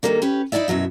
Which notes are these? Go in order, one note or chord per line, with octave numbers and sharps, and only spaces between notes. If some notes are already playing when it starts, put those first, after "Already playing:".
D3 D#3 F#3 G3 A#3 D4
C#4 G4 B4
D#4 E4 F#4 D5 E5
F#2 B2 F#3 E5